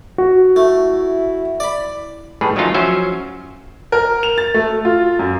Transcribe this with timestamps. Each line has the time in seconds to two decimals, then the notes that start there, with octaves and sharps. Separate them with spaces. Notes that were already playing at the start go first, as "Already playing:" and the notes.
0.18 F#4
0.56 A3 E4
1.60 D5 B5
2.41 A2 G3 G#4 B4
2.56 D#3 F#3 A3 C#4 D#4 F4
2.74 F3 F#3 C#4 F#4 C5 E5
3.92 A#4
4.23 F7
4.38 A6
4.54 A3
4.85 F4
5.19 F#2